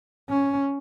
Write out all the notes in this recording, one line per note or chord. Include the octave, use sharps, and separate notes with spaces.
C#4